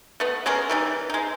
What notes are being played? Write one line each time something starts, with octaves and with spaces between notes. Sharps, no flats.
A3 B3
G#3 B3 C#4 A#4
E3 G3 D#4
G#3 D#4